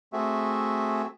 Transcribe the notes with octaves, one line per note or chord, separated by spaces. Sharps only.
A3 C4 F#4 G#4 E5